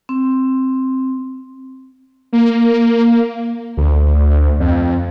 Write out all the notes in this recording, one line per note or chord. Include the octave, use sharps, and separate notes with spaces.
C4
A#3
D2
F2